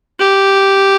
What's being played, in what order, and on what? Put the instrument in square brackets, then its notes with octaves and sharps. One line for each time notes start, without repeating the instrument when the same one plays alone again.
[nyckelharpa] G4